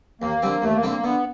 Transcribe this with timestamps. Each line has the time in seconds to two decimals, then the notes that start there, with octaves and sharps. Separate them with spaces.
0.21 D#2 A#3
0.42 D3 G3 C4
0.62 D#2 A3
0.76 A#3
0.83 D3 G3 C4
0.90 A#3
1.03 D3 B3